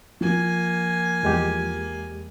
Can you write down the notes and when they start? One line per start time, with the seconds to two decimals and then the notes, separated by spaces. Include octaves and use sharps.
0.21 F3 A#3 G#5
1.23 E2 G#3 G4